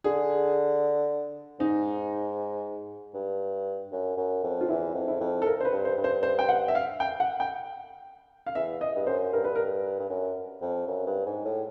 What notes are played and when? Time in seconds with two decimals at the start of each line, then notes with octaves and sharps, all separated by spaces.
0.04 D3 G#4
1.59 G#2 D#4
3.14 G2
3.92 F#2
4.17 F#2
4.44 F2
4.61 F4
4.69 E2 E4
4.94 F2
5.08 E4
5.20 F2
5.42 A4
5.46 A#4
5.60 C5
5.65 B4
5.72 G2
5.85 C5
5.97 G2
6.04 C5
6.23 C5
6.39 G5
6.49 F#5
6.68 E5
6.75 F5
7.00 G5
7.20 F#5
7.40 G5
8.46 F5
8.55 E2 E5
8.81 D#5
8.96 G2
9.07 F#2 C5
9.33 G2 A#4
9.44 B4
9.55 A#4
9.99 G2
10.10 F#2
10.61 F2
10.87 F#2
11.06 G2
11.26 G#2
11.45 A2